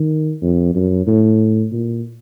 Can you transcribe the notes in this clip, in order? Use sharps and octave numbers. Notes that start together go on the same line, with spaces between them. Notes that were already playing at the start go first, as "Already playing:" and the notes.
Already playing: D#3
F2
F#2
A2
A#2